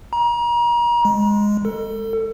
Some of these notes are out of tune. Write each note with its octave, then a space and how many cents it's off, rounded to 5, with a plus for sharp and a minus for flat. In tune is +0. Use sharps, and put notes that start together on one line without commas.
A#5 +35
G#3 -5
A4 +30